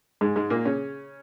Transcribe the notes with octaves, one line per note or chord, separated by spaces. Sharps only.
G#2 G#3
G#2 G#3
A#2 A#3
C#3 C#4